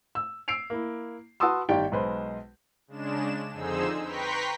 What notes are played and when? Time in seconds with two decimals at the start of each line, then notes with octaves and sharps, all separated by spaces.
0.15 E6
0.48 E6 C7 D7 F7
0.70 A#3 E4
1.40 F#4 B4 A5 C6 D#6 E6
1.69 G1 D#3 G4 D5 G5
1.92 B1 G#3 B4 C5
2.88 C#3 G#3 D4 E7
3.52 F2 D3 D#4 G#4 C5 E6
4.03 B4 G5 A#5 C6 C#6 B6